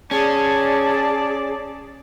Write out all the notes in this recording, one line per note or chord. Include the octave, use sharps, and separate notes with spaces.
C#4 G#4 D5 A5